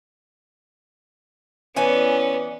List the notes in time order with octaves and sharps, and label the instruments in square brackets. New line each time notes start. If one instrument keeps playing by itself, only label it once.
[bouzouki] E3 D5 G#5 [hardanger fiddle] B3 [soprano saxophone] C#4